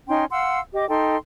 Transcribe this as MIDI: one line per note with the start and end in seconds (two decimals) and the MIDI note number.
0.07 0.25 61
0.07 0.25 63
0.07 0.25 79
0.07 0.25 84
0.30 0.59 77
0.30 0.59 78
0.30 0.59 84
0.30 0.59 88
0.72 0.87 67
0.72 0.87 75
0.72 0.87 86
0.89 1.16 63
0.89 1.16 69
0.89 1.16 79
0.89 1.16 84